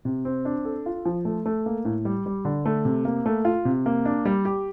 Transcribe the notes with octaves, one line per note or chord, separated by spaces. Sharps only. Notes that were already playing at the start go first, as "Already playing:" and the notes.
C3
C4
D4
A4
F4
F3
A3
A3
A#3
A2
G3
G3
D3
A3
C3
A#3
A3
F4
C3
A#3
D4
G3
G4